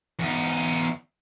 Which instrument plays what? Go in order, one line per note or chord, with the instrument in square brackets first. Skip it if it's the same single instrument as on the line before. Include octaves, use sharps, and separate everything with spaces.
[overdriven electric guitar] E2 D#4